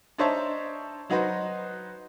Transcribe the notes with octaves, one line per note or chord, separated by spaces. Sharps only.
D4 D#4 C5 C#5 E5 A5
F#3 D#4 F#4 B4 C5